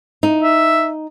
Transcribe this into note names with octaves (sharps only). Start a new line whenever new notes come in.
D#4
E5